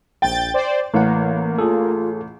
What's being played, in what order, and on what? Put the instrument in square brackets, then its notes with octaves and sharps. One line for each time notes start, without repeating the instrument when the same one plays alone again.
[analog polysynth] A#1 G6 A6 [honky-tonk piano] G5
[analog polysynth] C5 D5
[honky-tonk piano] A1 [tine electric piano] E3 F#5 [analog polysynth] A#3
[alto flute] F4 [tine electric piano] G#4 A4